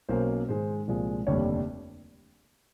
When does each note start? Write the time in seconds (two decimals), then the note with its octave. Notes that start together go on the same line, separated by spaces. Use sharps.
0.09 B1 B2 F#3 A#3 C#4 C5
0.48 G#2 D#3 G#3 C5
0.87 C2 A#2 F3 G#3
1.27 F1 D#2 D3 G3 C#5